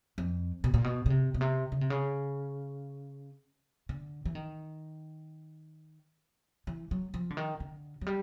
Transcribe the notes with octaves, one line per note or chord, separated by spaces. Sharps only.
F2
B2
A#2
B2
C#3
C3
B2
C3
C#3
C3
C#3
D3
E3
D#3
E3
F#3
F3
D3
D#3
D3
F#3
G3